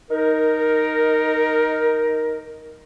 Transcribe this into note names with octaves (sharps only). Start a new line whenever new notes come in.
D#4 A#4